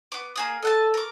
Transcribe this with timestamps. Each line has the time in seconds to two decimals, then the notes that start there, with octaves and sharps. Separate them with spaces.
0.12 B3 D6
0.36 A#3 G#4 D#6
0.63 A4 D#5 F#5 A5
0.94 A#4 D6